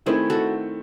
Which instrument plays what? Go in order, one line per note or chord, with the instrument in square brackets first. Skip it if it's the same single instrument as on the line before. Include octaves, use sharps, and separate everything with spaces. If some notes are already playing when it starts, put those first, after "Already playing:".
[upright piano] D#3 A3 C4 [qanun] E4 G#4
[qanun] F#4 A4